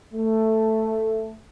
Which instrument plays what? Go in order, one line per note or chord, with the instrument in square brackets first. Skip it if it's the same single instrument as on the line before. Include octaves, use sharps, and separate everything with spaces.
[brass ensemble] A3